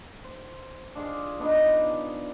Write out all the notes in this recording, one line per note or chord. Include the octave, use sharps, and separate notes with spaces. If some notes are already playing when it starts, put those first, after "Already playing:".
C5
D4 F4 G#4
B3 D4 D#4 D#5